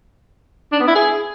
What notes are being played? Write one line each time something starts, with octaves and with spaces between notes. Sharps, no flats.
D4
B3
E4
G#4